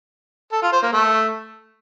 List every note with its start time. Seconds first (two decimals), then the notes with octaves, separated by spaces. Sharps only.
0.52 A4
0.62 F4
0.72 C5
0.83 A#3
0.93 A3